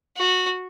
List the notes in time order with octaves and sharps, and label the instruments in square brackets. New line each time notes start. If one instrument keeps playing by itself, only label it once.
[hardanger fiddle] F#4